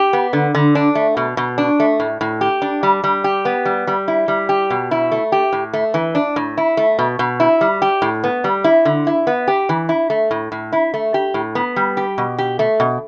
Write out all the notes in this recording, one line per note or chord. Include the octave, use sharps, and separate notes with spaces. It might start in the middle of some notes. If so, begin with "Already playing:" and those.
Already playing: G4
B3
D3
D3
D4
A3
B2
B2
D4
A3
A2
A2
G4
D4
G3
G3
G4
B3
G3
G3
E4
G3
G4
B2
E4
A3
G4
A2
A3
E3
D4
A2
E4
A3
B2
B2
E4
G3
G4
A2
B3
G3
E4
D3
E4
B3
G4
E3
E4
A3
A2
A2
E4
A3
G4
A2
B3
G3
G4
B2
G4
A3
B2